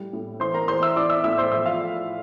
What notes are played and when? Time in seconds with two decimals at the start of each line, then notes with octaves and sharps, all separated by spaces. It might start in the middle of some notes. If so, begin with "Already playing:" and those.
Already playing: A2 G3
0.13 A2
0.40 E3 C5 C6
0.54 A#4 A#5
0.68 E2 C5 C6
0.82 E5 E6
0.96 E3 D5 D6
1.10 E5 E6
1.24 A2 E5 E6
1.38 C5 C6
1.52 F3 E5 E6
1.66 F4 F5